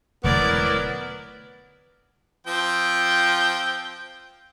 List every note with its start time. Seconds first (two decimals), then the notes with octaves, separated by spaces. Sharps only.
0.24 E1 D3 F#3 A3 B3 E4 A#4 D5
2.47 F3 C4 G5